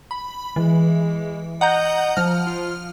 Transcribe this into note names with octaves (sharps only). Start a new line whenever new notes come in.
B5
E3 G#3
D#5 F#5 A#5 G6
F3 F6
F4